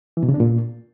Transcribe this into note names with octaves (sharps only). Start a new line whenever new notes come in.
E3
B2
C#3
D4
A#2